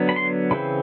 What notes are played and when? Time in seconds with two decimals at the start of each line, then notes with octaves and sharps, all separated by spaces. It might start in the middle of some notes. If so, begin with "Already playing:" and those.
Already playing: D3 F#3 B3
0.09 B5
0.16 C6
0.51 C#3 E3 C4 B5